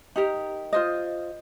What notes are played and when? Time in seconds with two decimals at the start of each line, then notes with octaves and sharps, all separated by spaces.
0.16 D#4 G4 A#4
0.73 F4 C5 D#5